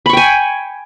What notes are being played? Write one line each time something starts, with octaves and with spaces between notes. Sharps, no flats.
G5 G#5 B5 C#6